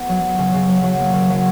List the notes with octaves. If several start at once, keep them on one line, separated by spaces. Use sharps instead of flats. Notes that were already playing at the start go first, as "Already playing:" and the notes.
Already playing: B3
F#3
F#3
C#3
C#3
F#3
F#3
A#3
C#3
F#3